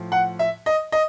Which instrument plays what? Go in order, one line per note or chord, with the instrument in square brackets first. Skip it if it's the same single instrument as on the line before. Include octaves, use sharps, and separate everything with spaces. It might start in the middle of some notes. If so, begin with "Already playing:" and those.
Already playing: [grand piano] A2 F3
F#5
E5
D#5
D#5